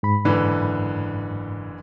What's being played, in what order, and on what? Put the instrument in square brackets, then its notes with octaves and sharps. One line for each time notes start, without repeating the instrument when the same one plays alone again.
[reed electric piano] G#2 B5
[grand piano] F#1 D3 E3